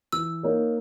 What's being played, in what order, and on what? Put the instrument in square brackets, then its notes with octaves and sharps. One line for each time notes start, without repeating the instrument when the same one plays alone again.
[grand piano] E3 [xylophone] E6
[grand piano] A#3 D#4 A#4 C#5